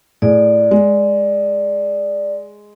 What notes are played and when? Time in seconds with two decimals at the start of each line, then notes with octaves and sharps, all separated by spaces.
0.22 A2 G#4 D5
0.71 G#3